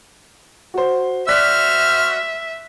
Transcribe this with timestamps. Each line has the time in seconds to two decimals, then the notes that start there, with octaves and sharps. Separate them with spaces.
0.74 F#4 C5
1.28 F#4 C5 D5 E5 F6 F#6 B6